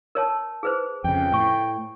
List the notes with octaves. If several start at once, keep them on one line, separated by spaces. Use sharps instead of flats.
A#4 C#5 A5
G#4 B4 C5
F2 C#3 G5
A2 G#5 C#6